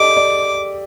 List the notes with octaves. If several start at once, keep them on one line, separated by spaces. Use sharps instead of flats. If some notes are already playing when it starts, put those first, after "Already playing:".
Already playing: G4 A4 D5 D#5 D6
D5